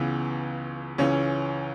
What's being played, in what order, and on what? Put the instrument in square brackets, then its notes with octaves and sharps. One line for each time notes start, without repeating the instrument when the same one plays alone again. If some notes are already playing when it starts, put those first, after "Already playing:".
Already playing: [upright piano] C#2 C#3 E3 B3
C#2 C#3 E3 C#4